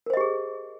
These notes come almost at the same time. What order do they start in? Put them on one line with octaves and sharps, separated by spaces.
A#4 C5 D#5 G4 G#4